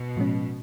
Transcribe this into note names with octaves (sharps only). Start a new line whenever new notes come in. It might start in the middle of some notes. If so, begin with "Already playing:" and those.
Already playing: B2
A2 F3 G#3 C#4